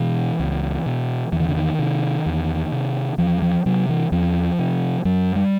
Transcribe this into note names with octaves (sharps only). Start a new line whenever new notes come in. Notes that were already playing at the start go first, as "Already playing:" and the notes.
Already playing: B2 E3
C#2
B2
E2 E3
D#3
D3
D#3
C3
E2
C3
E2 F3
F3
C3 F#3
E3
E2 F3
C3
F#2 F#3
G3